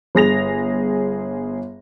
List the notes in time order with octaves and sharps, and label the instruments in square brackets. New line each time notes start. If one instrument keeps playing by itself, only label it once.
[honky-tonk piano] G1 G#4 A#6 F7